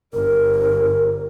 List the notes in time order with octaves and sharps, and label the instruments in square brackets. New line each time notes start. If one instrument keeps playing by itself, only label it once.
[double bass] G1 [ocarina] A#4